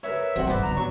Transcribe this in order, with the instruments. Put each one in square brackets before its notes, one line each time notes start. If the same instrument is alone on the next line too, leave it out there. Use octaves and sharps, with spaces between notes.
[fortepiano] A#4 B4 C#5 [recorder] E5
[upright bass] E3 C#4 [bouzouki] C4 F#5 [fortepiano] F#4
[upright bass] G#1 [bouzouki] B3 D4
[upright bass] A1 D3 [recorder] A#5
[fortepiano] F#3 [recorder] C#6